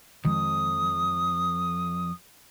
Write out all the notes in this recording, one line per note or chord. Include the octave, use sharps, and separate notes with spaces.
F2 D#3 F3 G#3 D#6